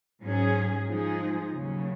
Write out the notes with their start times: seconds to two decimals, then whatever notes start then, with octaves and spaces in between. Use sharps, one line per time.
0.23 G#2 F#3 C#4 G#4
0.87 F3 G#3 D#4 G#4
1.53 D#2 C#3 F#3